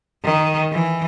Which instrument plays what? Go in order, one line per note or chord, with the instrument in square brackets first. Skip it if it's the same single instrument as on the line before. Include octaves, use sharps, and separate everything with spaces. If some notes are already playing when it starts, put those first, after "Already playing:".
[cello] D#3
E3